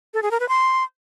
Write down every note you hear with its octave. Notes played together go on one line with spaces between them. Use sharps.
A4
G#4
A#4
B4
C6